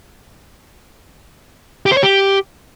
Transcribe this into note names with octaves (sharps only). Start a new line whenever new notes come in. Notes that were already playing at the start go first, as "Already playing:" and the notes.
G4
C5
C#5
G4